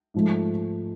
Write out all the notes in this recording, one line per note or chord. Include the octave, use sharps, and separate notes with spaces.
G#2 F3 A3